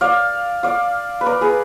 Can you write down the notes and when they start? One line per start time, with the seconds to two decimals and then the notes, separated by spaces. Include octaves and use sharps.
0.01 D5 F5
0.63 D5 F5
1.21 B4
1.26 A#4 D5
1.41 G#4 B4